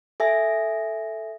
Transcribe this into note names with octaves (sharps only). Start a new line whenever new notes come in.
A4 E5 G#5 A#6